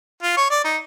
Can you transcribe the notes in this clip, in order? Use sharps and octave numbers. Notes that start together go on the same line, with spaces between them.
F4
C#5
D5
D#4